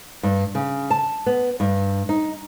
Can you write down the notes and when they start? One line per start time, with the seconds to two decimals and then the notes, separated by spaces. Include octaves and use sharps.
0.23 G2
0.55 C#3
0.90 A5
1.26 B3
1.60 G2
2.09 D#4